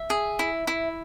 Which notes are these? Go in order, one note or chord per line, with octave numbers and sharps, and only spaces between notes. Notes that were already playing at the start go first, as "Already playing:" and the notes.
Already playing: E5
G#4
E4
E4